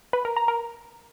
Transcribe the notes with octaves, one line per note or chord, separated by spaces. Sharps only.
B4
A#4
A#5
A#4